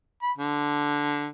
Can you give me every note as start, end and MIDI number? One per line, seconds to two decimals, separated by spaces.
0.22 0.31 83
0.37 1.26 50